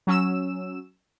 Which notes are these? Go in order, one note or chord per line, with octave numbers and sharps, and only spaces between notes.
F#3 C#4 E6 E7